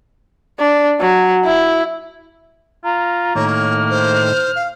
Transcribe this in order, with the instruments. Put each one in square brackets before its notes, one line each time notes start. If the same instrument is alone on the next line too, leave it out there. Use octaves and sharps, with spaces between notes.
[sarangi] D4
F#3
E4
[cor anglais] F4 [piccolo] A#5
[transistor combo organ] A2 D#3 [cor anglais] A#3 [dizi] C#5
[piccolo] F6
[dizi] C5
F5